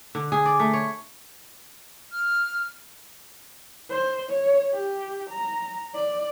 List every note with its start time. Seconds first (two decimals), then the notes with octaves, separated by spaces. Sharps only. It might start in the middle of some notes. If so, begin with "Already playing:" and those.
0.15 D3
0.32 G#4
0.46 D5
0.59 A3
0.73 C#5
2.12 F6
3.90 C5
4.30 C#5
4.74 G4
5.30 A#5
5.94 D5